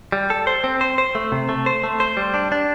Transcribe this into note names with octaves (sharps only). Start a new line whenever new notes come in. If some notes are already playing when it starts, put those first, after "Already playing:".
G3
A4
C5
C4
C5
C5
A3
C3
A3
C5
A3
C5
G3
D4
D4